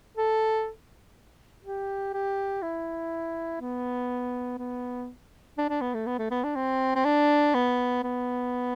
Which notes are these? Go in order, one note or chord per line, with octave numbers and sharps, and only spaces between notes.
A4
G4
G4
E4
B3
B3
D4
D4
B3
A3
B3
A3
B3
D4
C4
C4
D4
B3
B3